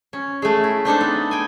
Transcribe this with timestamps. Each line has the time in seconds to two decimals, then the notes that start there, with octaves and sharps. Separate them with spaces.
0.13 C#4
0.42 G#3 A3
0.64 E4
0.85 C4 D4 D#4 A4
1.01 B3
1.31 G5 G#5